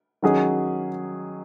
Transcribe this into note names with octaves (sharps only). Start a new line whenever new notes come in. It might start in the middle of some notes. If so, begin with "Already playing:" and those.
D#3 F#3 C#4 G#4